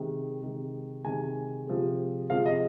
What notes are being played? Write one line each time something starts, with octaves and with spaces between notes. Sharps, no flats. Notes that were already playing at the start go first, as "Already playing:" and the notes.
Already playing: C3 D#3 G#3
C3 D#3 G#3
C3 D#3 G#3 G#5
C3 F3 G#3
C3 F3 G#3 F5
D#5